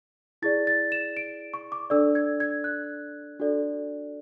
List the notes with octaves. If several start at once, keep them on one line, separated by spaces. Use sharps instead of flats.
E4 G#4 D5 A6
A6
E7
D7
C#6
D6
D4 A4 D5 E6
G#6
G#6
F#6
D4 F#4 A4 D5